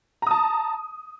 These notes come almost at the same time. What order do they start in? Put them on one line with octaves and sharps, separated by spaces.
A#5 D#6 A5